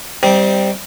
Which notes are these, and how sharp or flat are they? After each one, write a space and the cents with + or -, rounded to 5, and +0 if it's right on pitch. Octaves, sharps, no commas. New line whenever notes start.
G3 +0 C4 -5 D#4 +40